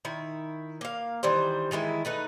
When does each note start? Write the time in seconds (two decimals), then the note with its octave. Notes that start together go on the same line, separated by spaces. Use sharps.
0.05 D#3 E4
0.81 A#3 F5
1.23 D#3 E3 G3 C5
1.71 D#3 E3 G#3 E4
2.05 A3 D#4 B4